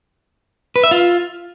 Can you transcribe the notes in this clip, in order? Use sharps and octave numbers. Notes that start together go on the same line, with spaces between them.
B4
E5
F4